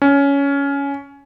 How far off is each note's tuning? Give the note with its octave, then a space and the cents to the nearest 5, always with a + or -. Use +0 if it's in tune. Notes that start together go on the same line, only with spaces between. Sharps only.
C#4 +15